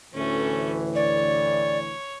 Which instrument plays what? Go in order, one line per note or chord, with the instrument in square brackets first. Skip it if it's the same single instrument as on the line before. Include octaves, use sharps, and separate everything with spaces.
[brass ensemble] D2 A2 E3 [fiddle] A3 C#4
[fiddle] C#5 [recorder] D5